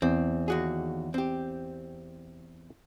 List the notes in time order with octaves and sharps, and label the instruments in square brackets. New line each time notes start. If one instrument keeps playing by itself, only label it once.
[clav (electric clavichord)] E2 [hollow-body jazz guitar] C4
[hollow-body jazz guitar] D#2 F#4 G#4
C4 G4